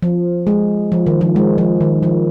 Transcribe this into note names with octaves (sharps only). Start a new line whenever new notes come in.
F3
G#3
F3
D#3
F3
G#3
F3
D#3
F3